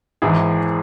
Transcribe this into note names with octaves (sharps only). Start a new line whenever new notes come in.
G#1 G#2 E3 E4 G#4